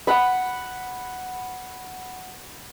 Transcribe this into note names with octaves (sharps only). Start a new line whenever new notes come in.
F#5 B5